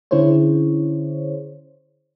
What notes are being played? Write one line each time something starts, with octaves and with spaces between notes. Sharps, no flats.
D3 C#4 E4 G#4 C5 C#5